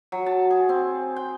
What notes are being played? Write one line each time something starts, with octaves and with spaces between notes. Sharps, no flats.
F#3
A5
G#4
C4
G5